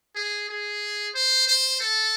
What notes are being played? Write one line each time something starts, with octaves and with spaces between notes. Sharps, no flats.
G#4
G#4
C5
C5
A4